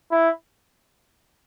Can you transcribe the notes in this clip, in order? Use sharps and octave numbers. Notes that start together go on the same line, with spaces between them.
E4